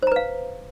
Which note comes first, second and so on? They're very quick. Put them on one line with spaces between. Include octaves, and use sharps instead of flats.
C5 A#5 B4 F5